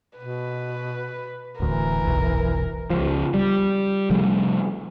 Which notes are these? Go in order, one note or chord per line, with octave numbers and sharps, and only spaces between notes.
B2 B4
D1 D2 E3 A#4
F1 B1
C#2 F3
G3
C3 F3 G3 A3